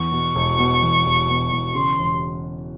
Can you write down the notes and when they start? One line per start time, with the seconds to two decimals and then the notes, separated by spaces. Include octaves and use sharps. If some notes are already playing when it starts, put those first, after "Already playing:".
Already playing: E2 C#6
0.12 B2
0.35 E1
0.59 B2
0.82 E2
1.06 E1
1.29 B2
1.52 E2
1.75 C#3 C6
1.98 E1